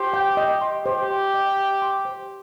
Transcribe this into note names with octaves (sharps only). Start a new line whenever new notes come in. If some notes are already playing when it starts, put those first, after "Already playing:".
Already playing: G4 C5
G5
D#5
C6
G4 C5
C6
D#5
G5
C6
C5